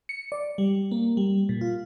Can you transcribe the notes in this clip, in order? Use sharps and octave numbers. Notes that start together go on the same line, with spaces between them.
C#7
D5
G3
A#3
G3
A#2
F4